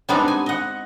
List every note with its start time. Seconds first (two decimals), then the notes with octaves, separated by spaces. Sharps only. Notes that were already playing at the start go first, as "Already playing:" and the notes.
0.09 G3 G#3 B3 C4 D4 D#4
0.28 G#5
0.46 D#5 F#5